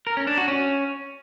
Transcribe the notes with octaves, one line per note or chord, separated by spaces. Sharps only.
A#4
C#4
D4
F#4
C#4